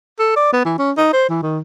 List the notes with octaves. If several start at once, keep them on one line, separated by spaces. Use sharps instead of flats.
A4
D5
B3
E3
C#4
D#4
C5
E3
D#3